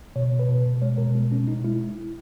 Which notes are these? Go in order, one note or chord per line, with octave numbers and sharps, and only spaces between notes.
B2 C#5
B2
B4
B2
B2
G#3 C#5
B2 A#4
G#3 B3
B2 C#4
B2 D#4
G#3 E4